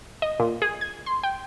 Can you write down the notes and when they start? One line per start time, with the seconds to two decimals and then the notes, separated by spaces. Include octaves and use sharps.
0.22 D#5
0.40 A#2
0.62 G#4
0.81 G#6
1.06 C6
1.23 G5